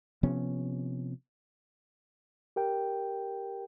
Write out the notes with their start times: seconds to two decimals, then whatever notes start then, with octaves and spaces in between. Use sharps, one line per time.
0.23 C3 F3 B3 C#4
2.56 G4 A#4 G5